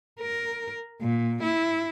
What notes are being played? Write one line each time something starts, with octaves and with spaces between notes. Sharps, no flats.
A#4
A#2
E4